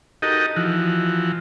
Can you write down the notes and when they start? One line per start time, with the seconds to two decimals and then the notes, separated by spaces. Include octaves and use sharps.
0.22 D#4 F#4 G4 A4 A#4 D#5
0.56 E3 F3 F#4